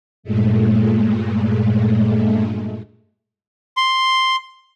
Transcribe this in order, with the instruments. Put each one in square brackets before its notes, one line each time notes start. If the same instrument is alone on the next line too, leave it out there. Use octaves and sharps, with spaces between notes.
[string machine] G2 A#2 G#3 A3
[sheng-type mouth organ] C6